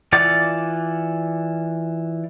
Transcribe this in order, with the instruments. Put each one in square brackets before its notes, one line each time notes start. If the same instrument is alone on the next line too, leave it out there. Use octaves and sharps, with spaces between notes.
[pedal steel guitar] E3 F4 D5 F#5 D6